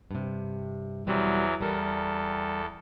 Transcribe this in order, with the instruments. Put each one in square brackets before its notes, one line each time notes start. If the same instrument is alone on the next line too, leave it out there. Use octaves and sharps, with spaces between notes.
[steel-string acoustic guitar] G2 C3
[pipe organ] E2 E3 F#3 [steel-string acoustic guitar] B2 G3 C4
[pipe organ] E2 A4 [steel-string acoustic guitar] G3 A#4